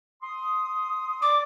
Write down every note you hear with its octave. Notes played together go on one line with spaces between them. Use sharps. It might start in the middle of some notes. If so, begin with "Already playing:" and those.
C6 D#6
D5 D6